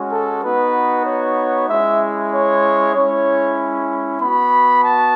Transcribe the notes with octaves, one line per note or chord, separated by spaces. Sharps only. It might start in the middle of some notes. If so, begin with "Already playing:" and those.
Already playing: G#3 C#4 F#4
A4
B3 D#4 F#4 B4
C#5
G#3 C#4 E4 E5
C#5
G#3 C#4 E4 C#5
B3 F#4 B5
A5